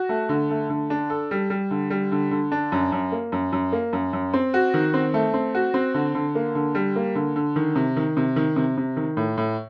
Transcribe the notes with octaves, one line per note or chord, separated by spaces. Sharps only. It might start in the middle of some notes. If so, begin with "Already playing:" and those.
Already playing: F#4
A3
D3
A3
D3
D4
A4
G3
G3
D3
G3
D3
D3
D4
F#2
F#2
A#3
F#2
F#2
A#3
F#2
F#2
C4
F#4
D#3
C4
A3
C4
F#4
C4
D3
D3
A#3
D3
G3
A#3
D3
D3
D#3
C3
D#3
C3
D#3
C3
C3
D#3
A2
A2